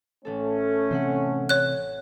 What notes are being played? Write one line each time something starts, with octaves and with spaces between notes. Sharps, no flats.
A1 A3 C#4 A4
C3 E3 C4 C5 E5 F#5
C#5 F#6